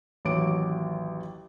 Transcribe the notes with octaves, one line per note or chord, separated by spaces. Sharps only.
A1 D#2 F#3 C#5 D6 D7